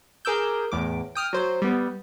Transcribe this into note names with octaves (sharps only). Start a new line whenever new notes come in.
G#4 A#4 D6 E6 G6
E2 A2 D6
G5 D#6 F6
F#3 C5
G3 B3